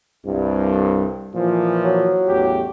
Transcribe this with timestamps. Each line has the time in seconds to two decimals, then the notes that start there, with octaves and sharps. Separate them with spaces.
0.25 C2 G2
1.35 A#2 E3 F3
1.85 F#3
2.28 A1 E2 G4